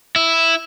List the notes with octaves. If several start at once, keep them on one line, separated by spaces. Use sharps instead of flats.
E4